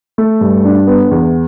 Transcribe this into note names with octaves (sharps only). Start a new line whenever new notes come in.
A3
G2
D4
B3
E2